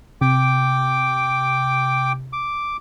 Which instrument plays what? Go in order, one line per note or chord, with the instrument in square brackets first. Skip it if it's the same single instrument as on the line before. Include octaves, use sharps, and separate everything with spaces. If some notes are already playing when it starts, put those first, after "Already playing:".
[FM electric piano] C3 [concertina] G5 D6
[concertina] D6